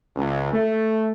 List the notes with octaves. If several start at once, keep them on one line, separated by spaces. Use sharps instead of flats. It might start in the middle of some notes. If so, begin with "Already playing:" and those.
C#2
A3